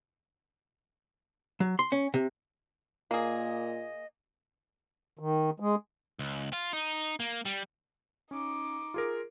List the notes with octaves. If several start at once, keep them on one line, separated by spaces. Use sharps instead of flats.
F#3
C6
C#4
C3
A#2 A#3 G#4 D#5
D#3
G#3
C#2
F4
D#4
A#3
G3
C#4 D#4 D6
F4 G#4 A#4